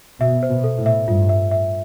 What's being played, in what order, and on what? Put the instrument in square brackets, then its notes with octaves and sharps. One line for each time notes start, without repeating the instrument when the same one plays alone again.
[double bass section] B2 [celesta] E5
[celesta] C5
[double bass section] B2
[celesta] A4
[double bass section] A2
[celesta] E5
[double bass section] G2 [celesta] F4
[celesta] E5
E5